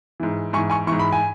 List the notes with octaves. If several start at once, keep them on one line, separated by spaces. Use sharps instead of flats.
G#2 E3
G#2 E3 G#5 C#6
G#5 C#6
G#2 E3 C#6
B5
G#5